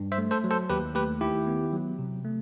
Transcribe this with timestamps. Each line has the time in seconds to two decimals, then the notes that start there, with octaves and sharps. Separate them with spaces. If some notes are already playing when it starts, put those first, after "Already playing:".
Already playing: G2
0.12 C5 E5
0.18 A3
0.31 A4 C5
0.44 F#3
0.51 A4 C5
0.70 D#2 G4 B4
0.95 A3 G4 B4
1.21 D#3 E4 G4
1.47 B3
1.73 F#3
1.99 C3
2.25 A3